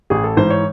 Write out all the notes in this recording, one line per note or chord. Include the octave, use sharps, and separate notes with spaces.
A1 G#4
A4
G#2 E3 C5
C#5